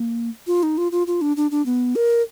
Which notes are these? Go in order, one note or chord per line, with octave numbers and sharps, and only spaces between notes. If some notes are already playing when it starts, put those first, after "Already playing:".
Already playing: A#3
F4
D#4
F4
F4
F4
D4
D4
D4
B3
A#4